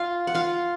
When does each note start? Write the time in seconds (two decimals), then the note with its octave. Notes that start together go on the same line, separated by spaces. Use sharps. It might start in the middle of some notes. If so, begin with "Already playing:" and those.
Already playing: F4 F5
0.27 F#5
0.35 F4 F5